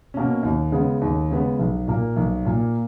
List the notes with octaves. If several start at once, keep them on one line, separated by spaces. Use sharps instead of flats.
B2 A#3 C#4
D#2
C#3 G#3 B3
D#2
C#3 G#3 B3
B1
A#2 A#3
B1
A#2 A#3